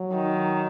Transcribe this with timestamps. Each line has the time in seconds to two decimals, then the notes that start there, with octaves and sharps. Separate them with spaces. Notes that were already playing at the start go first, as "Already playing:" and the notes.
Already playing: F#3
0.13 D#3